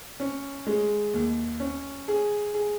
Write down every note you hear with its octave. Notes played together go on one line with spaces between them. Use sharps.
C#4
G#3
D#2
C#4
G#4
G#4